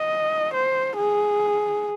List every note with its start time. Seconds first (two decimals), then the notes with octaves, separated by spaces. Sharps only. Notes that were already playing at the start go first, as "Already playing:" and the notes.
Already playing: D#5
0.53 C5
0.97 G#4